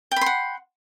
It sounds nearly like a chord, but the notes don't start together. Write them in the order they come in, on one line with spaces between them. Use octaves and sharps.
G5 B5 C6 F#5